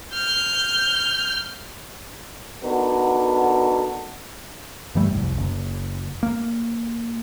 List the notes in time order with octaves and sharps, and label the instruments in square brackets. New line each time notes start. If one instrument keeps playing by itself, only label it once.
[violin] F6 G6
[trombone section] B3 D4 D#4 F#4 A4 A#4
[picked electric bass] G2 E3 G3 A3
F1 C2
F#1
A#3